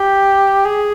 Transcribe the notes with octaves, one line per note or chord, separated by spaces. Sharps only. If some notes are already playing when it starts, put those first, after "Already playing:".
Already playing: G4
G#4